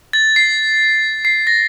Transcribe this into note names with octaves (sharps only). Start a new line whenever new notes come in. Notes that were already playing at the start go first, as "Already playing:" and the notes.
A6
C7
C7
A#6